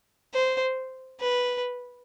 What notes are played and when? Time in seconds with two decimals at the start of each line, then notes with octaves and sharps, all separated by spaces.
0.34 C5
1.20 B4